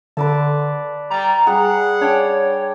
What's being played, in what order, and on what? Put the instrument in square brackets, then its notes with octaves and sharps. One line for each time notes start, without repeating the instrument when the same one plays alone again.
[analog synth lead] D3 [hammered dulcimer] B4 D5 A5
[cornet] G3 [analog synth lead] A#5
[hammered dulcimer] G3 G#4 [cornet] F#5
[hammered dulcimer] D4 G5 [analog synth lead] C#5